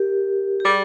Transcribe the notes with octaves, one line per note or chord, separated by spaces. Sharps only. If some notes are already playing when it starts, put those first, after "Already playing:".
Already playing: G4 A#4
G4
G3 G#4